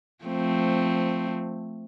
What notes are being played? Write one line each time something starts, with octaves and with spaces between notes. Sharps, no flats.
F3 A3 C4